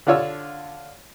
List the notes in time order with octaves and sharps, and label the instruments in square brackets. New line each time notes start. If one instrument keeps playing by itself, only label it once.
[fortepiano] D3 D4 F4 C#5 E6